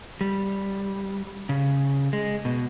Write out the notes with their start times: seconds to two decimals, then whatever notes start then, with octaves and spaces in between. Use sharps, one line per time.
0.21 G3
1.49 C#3
2.13 G#3
2.45 B2